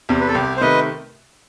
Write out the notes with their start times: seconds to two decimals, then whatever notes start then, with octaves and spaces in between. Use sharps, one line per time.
0.09 E2 C3
0.20 B4
0.28 A4
0.35 C2 G4
0.57 C5
0.61 C3 D#3 A3 B4 D#5